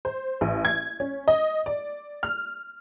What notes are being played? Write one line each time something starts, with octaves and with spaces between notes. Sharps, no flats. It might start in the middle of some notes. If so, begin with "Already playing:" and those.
C5
A1
G#6
C#4
D#5
D5
F6